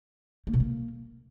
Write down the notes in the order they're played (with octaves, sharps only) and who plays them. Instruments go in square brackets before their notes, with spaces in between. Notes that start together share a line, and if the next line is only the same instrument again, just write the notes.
[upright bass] A#3
B2
A#3